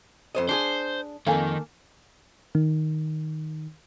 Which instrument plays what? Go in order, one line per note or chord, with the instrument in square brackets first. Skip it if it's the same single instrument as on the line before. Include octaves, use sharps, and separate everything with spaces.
[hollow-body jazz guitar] F2 C5 D#5
[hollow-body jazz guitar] D4 G4 G#4 [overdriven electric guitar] C5
[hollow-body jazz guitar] F2 G#2 [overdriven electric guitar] D#3 [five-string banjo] A#3 A4 G#5
[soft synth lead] D#3